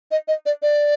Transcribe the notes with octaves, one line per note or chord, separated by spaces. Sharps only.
D#5
D#5
D5
D5